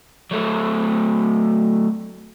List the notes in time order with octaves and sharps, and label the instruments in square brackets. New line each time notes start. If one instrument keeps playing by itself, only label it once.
[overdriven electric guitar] F#3 A3